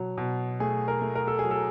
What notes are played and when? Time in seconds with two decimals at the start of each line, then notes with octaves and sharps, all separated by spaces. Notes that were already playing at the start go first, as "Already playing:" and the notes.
Already playing: B2 F#3
0.17 B2
0.60 A3 G#4
0.88 A#4
1.01 A3
1.15 A#4
1.27 A4
1.39 F#3 G#4
1.51 A4